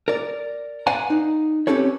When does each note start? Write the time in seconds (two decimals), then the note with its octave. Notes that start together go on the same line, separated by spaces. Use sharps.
0.08 A#4 D5
0.87 B4 D5 F5 F#5 G#5 A#5
1.10 D#4
1.67 C4 C#4 G4 A4 B4 C#5